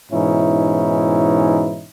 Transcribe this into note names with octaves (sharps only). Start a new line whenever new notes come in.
G#2 B2 E3 C#4 D#4 E4